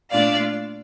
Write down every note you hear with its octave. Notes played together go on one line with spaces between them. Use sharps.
A#2 A3 D4 F4 D5 F5